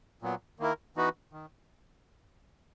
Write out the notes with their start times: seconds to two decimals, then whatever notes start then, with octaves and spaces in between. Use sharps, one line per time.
0.22 A#2 F#3 B3
0.59 D#3 A#3 E4 A#4
0.96 E3 B3 D#4 F#4 B4
1.33 D#3